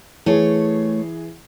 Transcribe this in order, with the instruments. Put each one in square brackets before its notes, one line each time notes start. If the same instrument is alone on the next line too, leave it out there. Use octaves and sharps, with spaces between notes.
[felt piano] E3 G#4 [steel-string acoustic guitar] A3 C#5